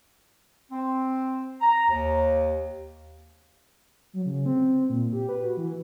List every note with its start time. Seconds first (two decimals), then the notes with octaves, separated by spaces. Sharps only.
0.71 C4
1.61 A#5
1.89 D#2
4.13 F#3
4.26 C#3
4.46 C4
4.90 A#2
5.13 G4
5.29 B4
5.43 F#4
5.57 E3